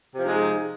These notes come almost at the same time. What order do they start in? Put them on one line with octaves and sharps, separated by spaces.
C3 F3 D#4 G#3